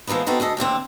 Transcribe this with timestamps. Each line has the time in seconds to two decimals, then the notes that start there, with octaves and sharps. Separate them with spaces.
0.07 E3 F3 G#3 A#3 B3
0.27 B3 C4 D#4 F#4 A4
0.40 D2 G#4 A4 D#5
0.57 D#2 A2 D3 C4